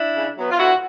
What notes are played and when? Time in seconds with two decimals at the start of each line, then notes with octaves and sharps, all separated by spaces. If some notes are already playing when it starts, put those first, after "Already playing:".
Already playing: D4 E4
0.16 C#3
0.38 F#3 B3
0.51 F4
0.59 D2 E4 F#4